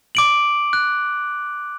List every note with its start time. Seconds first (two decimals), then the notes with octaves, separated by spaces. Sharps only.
0.15 D6 D7 F#7
0.73 F#6